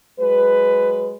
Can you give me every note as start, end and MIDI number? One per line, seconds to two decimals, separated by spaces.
0.20 1.16 54
0.20 1.16 56
0.20 1.16 71